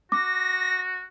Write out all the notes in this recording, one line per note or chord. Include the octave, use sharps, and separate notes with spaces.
F#4 D6 A#6